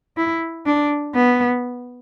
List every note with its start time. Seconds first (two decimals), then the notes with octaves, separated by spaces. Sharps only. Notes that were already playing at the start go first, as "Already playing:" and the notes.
0.17 E4
0.66 D4
1.15 B3